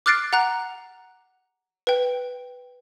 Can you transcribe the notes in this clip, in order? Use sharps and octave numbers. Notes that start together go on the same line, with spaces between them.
D6 F6 F#6 A6 C7 D7
F#5 A#5 F#6
B4 G5